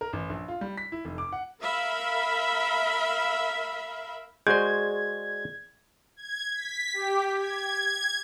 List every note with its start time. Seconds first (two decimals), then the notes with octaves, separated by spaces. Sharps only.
0.01 A#4
0.13 A1
0.30 A#1
0.48 F4
0.61 G3
0.77 B6
0.92 E4
1.05 F1
1.18 D6
1.32 F#5
1.62 A#4 E5 F5 B5
4.47 G#3 F#4 G#4 C5 D5 G6 G#6
6.16 G#6
6.54 B6
6.94 G4
7.38 G#6
7.86 G#6